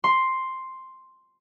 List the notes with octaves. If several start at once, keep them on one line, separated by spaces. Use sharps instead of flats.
C6